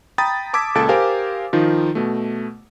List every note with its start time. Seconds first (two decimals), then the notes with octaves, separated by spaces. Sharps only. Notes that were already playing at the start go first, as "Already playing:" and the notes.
0.18 G5 A#5 B5 D#6 A6
0.54 A5 D6 E6 G#6 B6
0.75 C#2 A#2 A4 A5 A6 D7
0.89 G4 A#4 C5 F5 G#5
1.53 D#3 F3 D#4 F4
1.95 B2 A3